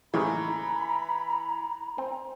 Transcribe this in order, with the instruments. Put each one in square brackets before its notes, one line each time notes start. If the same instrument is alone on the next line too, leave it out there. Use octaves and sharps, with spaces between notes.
[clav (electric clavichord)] D#2 A2 C#3 [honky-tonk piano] E3 [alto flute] A#5 [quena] B5
[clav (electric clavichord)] C4